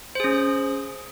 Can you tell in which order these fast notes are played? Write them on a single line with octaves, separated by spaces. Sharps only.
C5 G#4 C#4